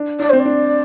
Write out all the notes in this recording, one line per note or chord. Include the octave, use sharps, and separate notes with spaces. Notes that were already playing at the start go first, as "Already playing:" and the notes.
Already playing: D4
D4 D5
C4 C5
D5
D4